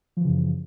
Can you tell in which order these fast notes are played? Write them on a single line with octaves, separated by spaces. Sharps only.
F3 E3 C#3 F#2